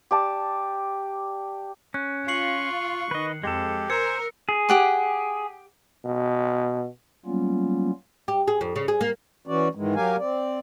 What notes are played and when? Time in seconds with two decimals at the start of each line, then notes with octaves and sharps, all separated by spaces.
0.11 G4 D5 A5
1.94 C#4 F#6
2.28 F4 C#6 C7 C#7 F#7
3.11 D#3 B4 D#5
3.44 F2 G#3 G4 A4
3.90 A#4 C5 G#5 E6 C#7
4.49 G#4
4.69 G4 F#5 D6
6.05 B2
7.26 F#3 G3 A#3 B3 C#4 F4
8.28 G4
8.48 G#4
8.61 F2
8.76 C#3
8.88 G#4
9.01 A#3
9.47 E3 C#4 F#4 D5
9.75 G#2 D#3 E3 G#3
9.95 F#3 G4 A#4 F5 G#5
10.19 C4 D5